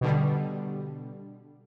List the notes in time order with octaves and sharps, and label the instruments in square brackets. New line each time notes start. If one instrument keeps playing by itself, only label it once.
[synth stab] B2 D3 G3